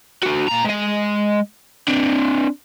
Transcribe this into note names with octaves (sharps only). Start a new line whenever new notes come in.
D4 F#4
A#2 A#5
G#3 D#5
C4 D4